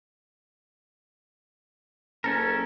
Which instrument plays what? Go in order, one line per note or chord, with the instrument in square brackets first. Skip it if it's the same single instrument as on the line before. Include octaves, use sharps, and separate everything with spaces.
[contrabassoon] F#1 [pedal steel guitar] C#4 A4 A#4